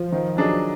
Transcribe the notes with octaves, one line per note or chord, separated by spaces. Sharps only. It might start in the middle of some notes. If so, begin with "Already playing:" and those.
Already playing: F3
D#3
F#3 D4 G#4 D#5